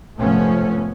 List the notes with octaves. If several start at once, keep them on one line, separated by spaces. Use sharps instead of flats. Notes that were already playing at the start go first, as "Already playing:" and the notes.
F1 G#2 F3 A3 B3 C#4